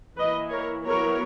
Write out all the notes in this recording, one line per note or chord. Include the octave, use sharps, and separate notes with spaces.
E3 A#3 E4 B4 D#5
A#4 C#5
F#3 B3 E4 A#4 C#5